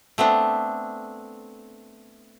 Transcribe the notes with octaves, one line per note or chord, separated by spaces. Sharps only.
A3 B3 C4 D4